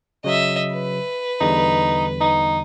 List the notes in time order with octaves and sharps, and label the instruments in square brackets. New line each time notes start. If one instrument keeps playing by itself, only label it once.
[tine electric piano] C#3 F#3 [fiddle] D#5 E5
[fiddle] B4
[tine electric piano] E2 D3 G3 [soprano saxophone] D#4
[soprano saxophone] D#4